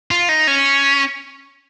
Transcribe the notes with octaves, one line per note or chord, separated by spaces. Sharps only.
F4
D#4
C#4